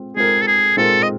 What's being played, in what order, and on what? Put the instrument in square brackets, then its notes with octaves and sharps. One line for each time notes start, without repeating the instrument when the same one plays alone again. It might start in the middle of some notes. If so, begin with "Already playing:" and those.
Already playing: [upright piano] G#3 C4 F4
[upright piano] G#3 C4 F4 A#4 [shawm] G#4
[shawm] A4
G#4
[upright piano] G#3 C4 F4 A#4 [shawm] A4
[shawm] D#5